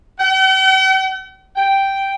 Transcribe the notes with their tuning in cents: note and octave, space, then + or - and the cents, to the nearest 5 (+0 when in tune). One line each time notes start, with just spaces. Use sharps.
G5 -45
G5 -5